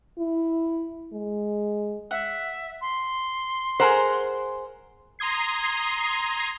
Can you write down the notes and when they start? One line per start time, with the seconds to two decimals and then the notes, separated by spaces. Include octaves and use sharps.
0.18 E4
1.13 G#3
2.11 E5 F#5
2.81 C6
3.80 G#4 A#4 C5 F#5
5.19 A#5 C6 D#6 G#6 C7